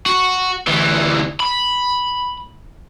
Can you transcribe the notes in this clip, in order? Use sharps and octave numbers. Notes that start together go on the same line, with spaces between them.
F#4
D2 E3
B5